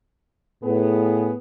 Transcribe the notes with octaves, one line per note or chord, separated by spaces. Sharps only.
A2 B3 G#4